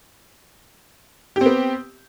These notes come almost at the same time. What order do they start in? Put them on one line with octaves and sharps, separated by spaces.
G4 C4 B3